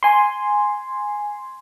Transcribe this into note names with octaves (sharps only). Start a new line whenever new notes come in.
G#5 C6